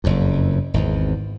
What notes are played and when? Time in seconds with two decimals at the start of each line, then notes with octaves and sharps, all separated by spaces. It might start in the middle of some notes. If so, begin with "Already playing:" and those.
0.04 F#1 F2
0.74 G#1 E2